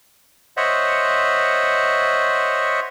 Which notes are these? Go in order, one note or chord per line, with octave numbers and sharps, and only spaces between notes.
C5 C#5 D#5 E5 F#5